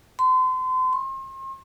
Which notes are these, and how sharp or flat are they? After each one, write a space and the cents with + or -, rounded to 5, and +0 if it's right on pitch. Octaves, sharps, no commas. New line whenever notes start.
C6 -35
C6 +40